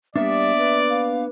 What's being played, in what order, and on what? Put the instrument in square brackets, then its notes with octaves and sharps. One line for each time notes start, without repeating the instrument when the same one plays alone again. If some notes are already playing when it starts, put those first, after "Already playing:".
[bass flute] G3 [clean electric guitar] A#3 B3 D4 [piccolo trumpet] D5 [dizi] E5
[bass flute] B4
[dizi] F5